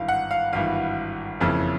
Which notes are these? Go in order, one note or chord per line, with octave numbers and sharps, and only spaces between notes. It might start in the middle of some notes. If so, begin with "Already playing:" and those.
Already playing: G#1 G2 E3 F5
F#5
F5
G#1 G2 E3 F5
F#1 F2 C#3 E3